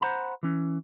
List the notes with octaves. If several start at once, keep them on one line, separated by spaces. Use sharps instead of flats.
C5 F#5 A#5 B5
E3 C#4